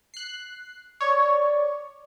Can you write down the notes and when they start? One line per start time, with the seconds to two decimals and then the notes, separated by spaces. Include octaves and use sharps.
0.14 F#6 C7
1.01 C#5 D5